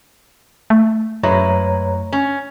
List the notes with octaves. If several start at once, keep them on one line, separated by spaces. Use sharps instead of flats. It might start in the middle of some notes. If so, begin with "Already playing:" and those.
A3
F#2 G#3 E4 B4 C#5 A#5
C#4